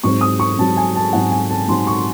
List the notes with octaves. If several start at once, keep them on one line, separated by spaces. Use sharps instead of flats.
G#2 F#3 C4 C#6
D#6
C#6
G#2 F#3 C4 A5
G#5
A5
G#2 F#3 C4 F#5
G#5
A5
G#2 F#3 C4 C6
C#6